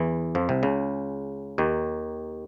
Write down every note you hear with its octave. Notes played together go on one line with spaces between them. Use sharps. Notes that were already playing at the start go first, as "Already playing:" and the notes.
Already playing: E2 E3
F2 F3
C2 C3
C#2 C#3
D#2 D#3